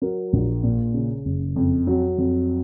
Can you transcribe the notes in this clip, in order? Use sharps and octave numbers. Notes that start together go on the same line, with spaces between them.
F#3 A#4
A#1
A#2
C#3
F#1
F2
F#3
F2